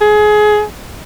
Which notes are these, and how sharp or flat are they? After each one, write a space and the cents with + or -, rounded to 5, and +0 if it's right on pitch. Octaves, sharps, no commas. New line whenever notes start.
G#4 +25